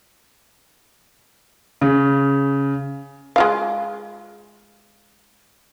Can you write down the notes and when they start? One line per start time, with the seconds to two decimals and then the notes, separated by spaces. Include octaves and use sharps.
1.81 C#3
3.36 G#3 F4 F5